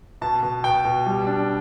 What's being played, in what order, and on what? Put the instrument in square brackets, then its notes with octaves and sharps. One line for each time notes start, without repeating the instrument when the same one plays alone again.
[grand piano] B2 A5
B2
B2 G5
B2
G3
D4